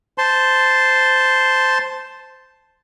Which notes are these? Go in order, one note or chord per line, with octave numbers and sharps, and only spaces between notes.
C5 A5 C6